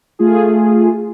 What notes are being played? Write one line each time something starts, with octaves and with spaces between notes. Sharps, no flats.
A3 F4 G#4